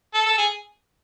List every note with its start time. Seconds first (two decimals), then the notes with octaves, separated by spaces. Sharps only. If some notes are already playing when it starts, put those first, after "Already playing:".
0.14 A4
0.26 A4
0.38 G#4